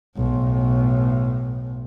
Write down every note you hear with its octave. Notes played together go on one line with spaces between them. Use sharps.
B1 A2